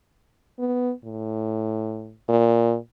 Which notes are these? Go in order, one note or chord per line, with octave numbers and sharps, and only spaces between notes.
B3
A2
A#2